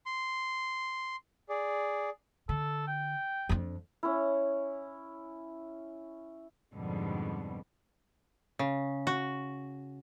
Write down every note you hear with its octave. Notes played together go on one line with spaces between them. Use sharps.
C6
G#4 D5
D3 A4
G5
F2 D4
C#4 E4
F2 G#2 B2 D3 G3
C#3
F#4